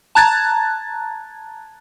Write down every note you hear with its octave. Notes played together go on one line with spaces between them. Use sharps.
A5 A#5 F#6 G#6 A6